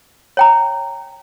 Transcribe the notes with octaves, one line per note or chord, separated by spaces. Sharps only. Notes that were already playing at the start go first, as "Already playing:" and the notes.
C#5 G5 A#5